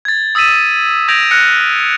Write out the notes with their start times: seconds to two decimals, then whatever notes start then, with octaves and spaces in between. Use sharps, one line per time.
0.05 G#6 A6
0.35 D#6 E6 A6 B6 D#7 E7
1.08 E6 G6 G#6 A#6 D7 F7
1.31 F6 F#6 A#6 C#7